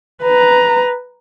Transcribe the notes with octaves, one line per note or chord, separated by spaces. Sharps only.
B4 A#5